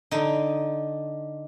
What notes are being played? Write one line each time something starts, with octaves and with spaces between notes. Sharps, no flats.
D3 D#4